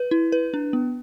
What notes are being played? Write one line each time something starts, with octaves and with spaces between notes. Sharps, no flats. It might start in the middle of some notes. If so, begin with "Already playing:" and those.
Already playing: B4
E4
B4
D4
B3